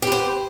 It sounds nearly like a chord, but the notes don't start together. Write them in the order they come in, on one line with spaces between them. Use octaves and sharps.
G4 B4 C5